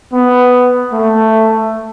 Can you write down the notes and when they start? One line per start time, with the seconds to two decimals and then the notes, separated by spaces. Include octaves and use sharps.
0.13 B3
0.93 A3